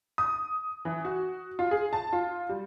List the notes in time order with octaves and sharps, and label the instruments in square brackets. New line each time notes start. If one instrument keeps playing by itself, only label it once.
[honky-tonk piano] D#6
E3
F#4
F4
G#4
A5
F4
G3